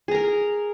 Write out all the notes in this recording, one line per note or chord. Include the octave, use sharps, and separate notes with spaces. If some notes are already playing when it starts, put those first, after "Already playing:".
G#4 A#4 A#5